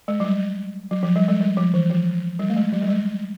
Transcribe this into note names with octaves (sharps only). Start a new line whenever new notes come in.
G#3
F#3
G3
F#3
F3
G3
G#3
G3
F3
E3
F3
G3
A3
G#3
F#3
G3
G#3